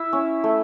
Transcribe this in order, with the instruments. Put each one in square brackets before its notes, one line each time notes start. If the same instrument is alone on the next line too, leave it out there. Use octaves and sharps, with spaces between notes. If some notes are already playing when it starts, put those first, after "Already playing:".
Already playing: [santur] E4 E5
C#4
A3